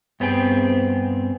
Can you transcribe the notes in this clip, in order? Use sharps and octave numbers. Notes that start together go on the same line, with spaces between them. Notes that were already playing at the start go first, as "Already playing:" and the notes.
G2 B3 C4 G#4 G5